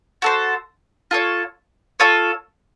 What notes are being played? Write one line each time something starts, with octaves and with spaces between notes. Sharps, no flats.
F#4 A4 C5
F4 A4 C#5
F4 A4 C#5